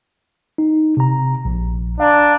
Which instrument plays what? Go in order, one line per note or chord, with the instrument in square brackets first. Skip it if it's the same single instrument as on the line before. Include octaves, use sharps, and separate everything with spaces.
[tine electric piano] D#4
C3 A#5
A#1
[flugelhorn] D4 [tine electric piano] F5 A#5